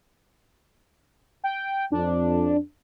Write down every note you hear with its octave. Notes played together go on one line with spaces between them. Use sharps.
G5
F2 D4